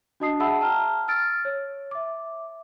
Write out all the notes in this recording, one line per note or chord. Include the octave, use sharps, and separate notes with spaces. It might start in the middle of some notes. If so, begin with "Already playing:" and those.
D4 F#4 D#5 A5 D#6 C7
G#4 E5 F#5 A5 B5 E6
G5 A5 A#5 F6
E6 F6 A6 D7
C#5
E5 D6